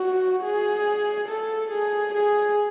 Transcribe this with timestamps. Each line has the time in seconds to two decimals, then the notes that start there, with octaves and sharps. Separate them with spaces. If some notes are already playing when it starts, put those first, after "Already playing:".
Already playing: F#4
0.44 G#4
1.28 A4
1.71 G#4
2.14 G#4